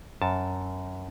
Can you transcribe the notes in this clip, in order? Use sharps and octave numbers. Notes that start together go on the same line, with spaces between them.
F#2 A5